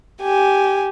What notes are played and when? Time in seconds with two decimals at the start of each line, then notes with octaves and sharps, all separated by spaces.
0.22 G4 G#5